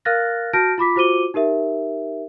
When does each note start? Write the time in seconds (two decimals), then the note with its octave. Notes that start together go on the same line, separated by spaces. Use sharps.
0.05 A#4 F5 F6 F#6 A6 A#6
0.53 F#4 A5 F6 G6 A#6 D7
0.78 F4 B5 D6 B6
0.96 F4 F#4 C5 D6 D#7 G7
1.34 D#4 G4 A#4 E5